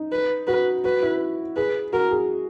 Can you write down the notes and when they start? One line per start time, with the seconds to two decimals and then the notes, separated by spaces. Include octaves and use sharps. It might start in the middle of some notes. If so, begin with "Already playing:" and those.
Already playing: D#4
0.12 B4
0.47 F#4 B4
0.84 F#4 B4
1.03 E4
1.56 G#4 B4
1.93 F#4 A#4
2.11 G#4